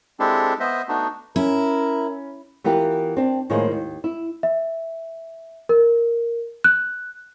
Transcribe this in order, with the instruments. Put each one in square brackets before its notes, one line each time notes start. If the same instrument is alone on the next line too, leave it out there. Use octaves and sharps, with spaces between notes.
[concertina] G#3 C4 D4 E4 G4 A4
B3 C5 D#5 E5
A3 B3 D4 D#4 F#4
[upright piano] C#4 [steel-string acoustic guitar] E4 [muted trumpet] A#4
[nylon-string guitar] E3 B3 F4 G4 A#4 B4
C4 D4
A2 D#3 F3 G#3 A#3 G#4
D#2
E4
[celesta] E5
A#4
F#6